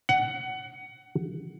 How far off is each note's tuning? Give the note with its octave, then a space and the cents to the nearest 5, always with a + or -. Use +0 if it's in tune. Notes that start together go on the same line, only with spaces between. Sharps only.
F#5 +20